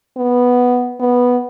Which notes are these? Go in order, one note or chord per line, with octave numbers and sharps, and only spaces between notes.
B3
B3